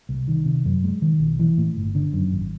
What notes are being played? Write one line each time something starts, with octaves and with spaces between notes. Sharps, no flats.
C2
D#3
C3
F#2
G#3
D#3
B1
E3
A2
G1
D3
F#2
G#1